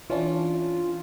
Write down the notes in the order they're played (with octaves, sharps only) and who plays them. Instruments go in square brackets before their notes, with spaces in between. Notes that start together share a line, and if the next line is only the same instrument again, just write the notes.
[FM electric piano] E3 C#4 D4 [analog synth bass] F4